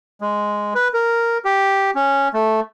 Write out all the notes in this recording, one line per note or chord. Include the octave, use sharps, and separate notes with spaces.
G#3
B4
A#4
G4
C#4
A3